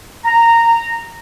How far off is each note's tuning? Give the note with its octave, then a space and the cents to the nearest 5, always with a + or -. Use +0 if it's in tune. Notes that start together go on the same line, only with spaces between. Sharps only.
A#5 -15